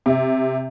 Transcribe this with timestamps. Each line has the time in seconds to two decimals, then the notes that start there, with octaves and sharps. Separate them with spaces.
0.06 C3